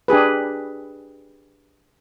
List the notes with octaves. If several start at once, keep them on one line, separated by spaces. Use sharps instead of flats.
D4 G4 G#4 B4